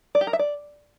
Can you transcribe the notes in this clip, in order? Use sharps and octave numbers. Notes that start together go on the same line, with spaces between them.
D5
G4
A#4
E5
D5